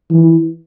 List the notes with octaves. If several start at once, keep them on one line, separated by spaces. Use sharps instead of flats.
E3